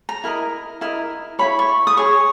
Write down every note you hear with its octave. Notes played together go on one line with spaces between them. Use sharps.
A#5
E4 A#4 D#5
E4 A#4 D#5
E4 G#4 C#5 B5
C#6
D#6
G#4 C#5 C#6